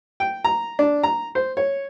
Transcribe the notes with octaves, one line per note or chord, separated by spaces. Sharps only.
G5
A#5
D4
A#5
C5
C#5